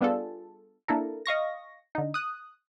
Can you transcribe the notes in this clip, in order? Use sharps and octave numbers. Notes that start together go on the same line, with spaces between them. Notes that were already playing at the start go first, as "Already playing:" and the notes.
G3 B3 D4 F4 G#4 A4
A#3 D4 E4 A4 A#4
D#5 F5 C#6 A#6
D3 D#4
D#6 F#6